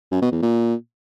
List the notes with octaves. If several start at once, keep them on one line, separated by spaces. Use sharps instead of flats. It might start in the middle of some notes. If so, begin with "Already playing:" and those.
F#2
B2
E2
A#2